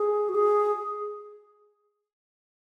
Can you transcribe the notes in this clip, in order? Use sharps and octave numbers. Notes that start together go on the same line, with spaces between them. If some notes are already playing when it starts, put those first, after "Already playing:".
Already playing: G#4
F#4
G#4